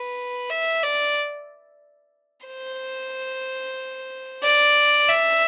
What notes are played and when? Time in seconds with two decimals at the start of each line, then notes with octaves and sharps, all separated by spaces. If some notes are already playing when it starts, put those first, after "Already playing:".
Already playing: B4
0.50 E5
0.83 D5
2.46 C5
4.43 D5
5.09 E5